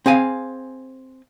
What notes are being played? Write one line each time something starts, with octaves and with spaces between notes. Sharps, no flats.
C4 G#4 F5 G#5